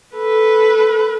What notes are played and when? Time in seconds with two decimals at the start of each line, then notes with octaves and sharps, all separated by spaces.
0.16 A4 B4